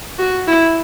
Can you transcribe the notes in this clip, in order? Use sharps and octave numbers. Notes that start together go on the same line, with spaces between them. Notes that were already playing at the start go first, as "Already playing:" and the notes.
F#4
E4